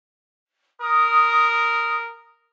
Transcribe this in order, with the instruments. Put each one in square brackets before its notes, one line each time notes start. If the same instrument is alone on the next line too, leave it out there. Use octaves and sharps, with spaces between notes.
[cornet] A#4 [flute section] D#6